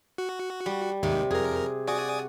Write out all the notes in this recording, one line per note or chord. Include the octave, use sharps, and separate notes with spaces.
F#4
G3
D#2 G#2 C3 D#3
F2 G#4 A#4
F#4 D5 G#5 D#6